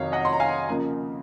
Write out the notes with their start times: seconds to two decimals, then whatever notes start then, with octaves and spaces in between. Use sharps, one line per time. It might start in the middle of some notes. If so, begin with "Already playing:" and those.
Already playing: F2 C3 D#3 F#3 C#5 F5
0.12 D#5 F#5
0.25 C6
0.33 A#5
0.40 F5 G#5
0.69 C#3 F3 A#3